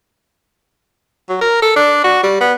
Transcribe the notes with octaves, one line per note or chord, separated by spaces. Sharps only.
F#3
A#4
A4
D4
F#4
G3
B3